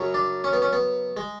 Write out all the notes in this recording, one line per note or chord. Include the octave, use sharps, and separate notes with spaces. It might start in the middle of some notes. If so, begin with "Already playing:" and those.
Already playing: F#2 C#3 F#3
D4
C#4
B3
C#4
B3
G#3